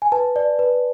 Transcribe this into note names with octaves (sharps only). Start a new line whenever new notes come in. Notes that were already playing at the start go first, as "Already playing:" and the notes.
G#5
B4 A5
D5
B4